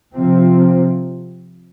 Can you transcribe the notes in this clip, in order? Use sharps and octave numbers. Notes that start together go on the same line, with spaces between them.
C3 F3 C4